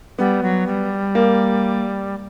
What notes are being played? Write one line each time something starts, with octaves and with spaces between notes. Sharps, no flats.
G3 B3
F#3
G3
A#3